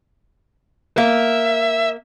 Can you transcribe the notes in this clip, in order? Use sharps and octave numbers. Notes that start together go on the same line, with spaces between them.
A#3 E5